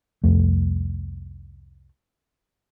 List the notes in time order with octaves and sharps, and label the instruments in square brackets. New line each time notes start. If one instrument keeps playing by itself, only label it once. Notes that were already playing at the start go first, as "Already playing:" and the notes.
[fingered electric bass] C2 F2 A3